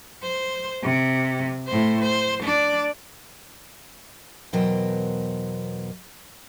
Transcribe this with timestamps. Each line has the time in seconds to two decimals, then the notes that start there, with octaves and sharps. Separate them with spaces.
0.22 C5
0.83 C3
1.68 A2 C5
2.01 C5
2.43 D4 D5
4.53 E2 B2 F#3 A#4 C5 G5